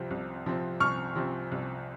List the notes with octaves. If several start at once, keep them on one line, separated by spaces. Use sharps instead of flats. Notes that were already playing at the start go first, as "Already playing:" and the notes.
Already playing: C2 C3 F3 C4
C2
C3 F3 C4
C2 C#6 F6
C3 F3 C4
C2